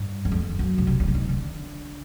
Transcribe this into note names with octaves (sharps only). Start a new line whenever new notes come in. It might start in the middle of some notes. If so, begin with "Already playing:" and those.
Already playing: G2
E2
F2
F#2
C#3
C3
C#3
E3
D#3
D3